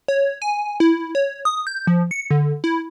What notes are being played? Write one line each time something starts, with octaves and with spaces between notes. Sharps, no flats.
C#5
G#5
E4
C#5
D#6
G6
F3
C#7
D3
E4